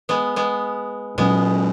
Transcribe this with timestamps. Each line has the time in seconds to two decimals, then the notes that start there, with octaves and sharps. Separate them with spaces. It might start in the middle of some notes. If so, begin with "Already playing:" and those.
0.09 G#3 B3
0.36 G#3 B3
1.18 A#2 F#3 G#3 B3 C#4